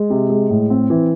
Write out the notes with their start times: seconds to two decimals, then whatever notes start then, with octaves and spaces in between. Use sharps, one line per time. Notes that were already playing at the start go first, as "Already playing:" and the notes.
Already playing: G#3
0.10 C3
0.30 G#3
0.50 A2
0.70 C4
0.90 E3